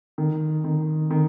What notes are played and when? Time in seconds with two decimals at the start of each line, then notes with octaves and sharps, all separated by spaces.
0.18 D#3
0.64 D#3
1.11 D#3